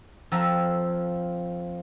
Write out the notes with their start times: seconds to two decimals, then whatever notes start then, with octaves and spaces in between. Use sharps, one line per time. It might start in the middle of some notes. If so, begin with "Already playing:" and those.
0.32 F2 F3 A4 A#5